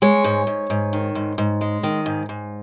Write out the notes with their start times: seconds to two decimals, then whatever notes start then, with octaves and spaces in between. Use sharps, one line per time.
0.02 G#3 C#5
0.24 G#2
0.47 G#2
0.70 G#2
0.93 D#3
1.15 G#2
1.38 G#2
1.61 G#3
1.83 D#3
2.06 G#2
2.29 G#2